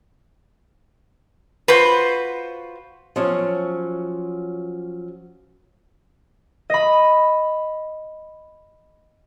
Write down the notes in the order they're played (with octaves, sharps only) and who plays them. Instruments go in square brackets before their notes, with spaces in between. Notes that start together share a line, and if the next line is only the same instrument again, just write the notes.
[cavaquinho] F4 F#4 C5 [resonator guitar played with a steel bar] B4
[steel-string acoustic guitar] F3 F#3 C#4
[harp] D#5 B5